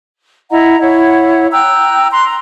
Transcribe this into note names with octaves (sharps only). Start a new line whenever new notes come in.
E4 D#5 F#5 A#5
E4 C#5 F#5
G5 A#5 E6 F#6
A#5 C6 F#6
A#5